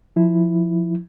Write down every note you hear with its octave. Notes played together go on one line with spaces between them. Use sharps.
F3 E4